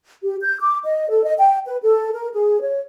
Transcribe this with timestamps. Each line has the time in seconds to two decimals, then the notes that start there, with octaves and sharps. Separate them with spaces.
0.23 G4
0.43 G6
0.60 D6
0.86 D#5
1.10 A4
1.24 D#5
1.38 G5
1.67 B4
1.83 A4
2.13 A#4
2.33 G#4
2.62 C#5